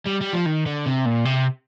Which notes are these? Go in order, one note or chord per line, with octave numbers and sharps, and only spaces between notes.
G3
G3
F3
D#3
D3
C3
A#2
C3